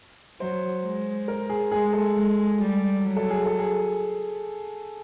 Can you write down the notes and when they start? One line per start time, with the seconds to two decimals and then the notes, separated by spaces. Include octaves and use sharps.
0.40 F#3 C5
0.85 G#3
1.28 A#4
1.49 G#4
1.71 G#3 G#4
1.93 A4
2.15 G#3
2.58 G3
3.02 F#3
3.16 A4
3.30 G#4
3.45 A4
3.59 G#4